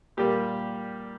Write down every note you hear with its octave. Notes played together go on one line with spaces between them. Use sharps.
A#2 G3 A#3 G4